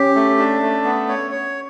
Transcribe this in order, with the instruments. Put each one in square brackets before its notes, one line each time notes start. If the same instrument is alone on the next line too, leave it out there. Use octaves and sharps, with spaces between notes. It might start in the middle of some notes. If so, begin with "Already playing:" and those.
Already playing: [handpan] C#4 [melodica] G4
[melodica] A3
D4
A3
B3
C#5
C#5